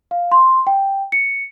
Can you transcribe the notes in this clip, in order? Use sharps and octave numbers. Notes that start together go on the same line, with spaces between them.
F5
C6
G5
C#7